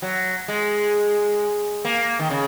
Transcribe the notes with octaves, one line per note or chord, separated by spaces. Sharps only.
F#3
G#3
A#3
D#3
C#3